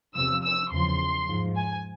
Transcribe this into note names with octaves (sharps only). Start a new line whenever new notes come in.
E2 C3 F3 E6
E6
E2 C#3 F3 C6
G#2 F3
G#5